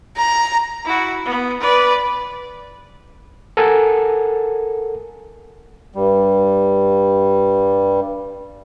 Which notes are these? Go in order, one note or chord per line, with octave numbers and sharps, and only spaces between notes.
A#5
E4 F#4
B3
B4 D5
A4 A#4 F#5 G#5
G2 G3